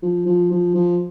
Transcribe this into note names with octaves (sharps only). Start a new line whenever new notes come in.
F3
F3
F3
F3